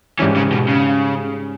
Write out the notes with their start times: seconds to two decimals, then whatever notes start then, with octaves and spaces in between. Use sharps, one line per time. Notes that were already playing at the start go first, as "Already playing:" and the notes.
0.19 G#2 E3 G3 C#4
0.36 C#3
0.52 B2
0.69 C#3